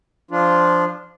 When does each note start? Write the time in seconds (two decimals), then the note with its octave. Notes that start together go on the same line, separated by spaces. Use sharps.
0.31 F3 D4 F4